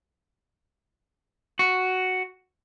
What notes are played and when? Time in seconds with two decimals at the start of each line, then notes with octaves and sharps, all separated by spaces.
1.59 F#4